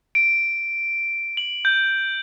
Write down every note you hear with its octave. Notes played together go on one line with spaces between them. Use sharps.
D7
F#7
G6